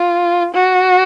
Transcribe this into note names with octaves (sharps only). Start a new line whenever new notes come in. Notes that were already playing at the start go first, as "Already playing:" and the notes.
Already playing: F4
F#4